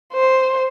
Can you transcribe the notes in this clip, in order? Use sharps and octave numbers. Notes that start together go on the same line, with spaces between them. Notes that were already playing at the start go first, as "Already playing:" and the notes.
C5